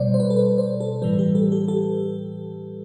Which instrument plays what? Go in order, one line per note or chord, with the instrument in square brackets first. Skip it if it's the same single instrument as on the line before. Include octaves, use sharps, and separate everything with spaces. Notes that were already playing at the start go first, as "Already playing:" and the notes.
Already playing: [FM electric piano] B2 G3 C5 D5
C5
B4
A4
B4
C5
A4
A2 E3 G3 B4
G4
A4
G4
A4